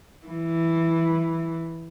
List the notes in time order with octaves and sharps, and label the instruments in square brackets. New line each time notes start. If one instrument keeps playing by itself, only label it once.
[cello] E3